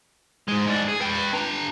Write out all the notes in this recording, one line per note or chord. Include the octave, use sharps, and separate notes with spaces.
G#2 G#3
G#2 D4
G#4
B4 G5
D4 A#5